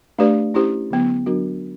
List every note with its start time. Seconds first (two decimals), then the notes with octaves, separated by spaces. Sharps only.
0.18 A3 D4 G4 B4 D5
0.54 C#4 E4 G4 C5
0.91 D3 F#3 B3
1.26 F#3 B3 D4 F#4 A#4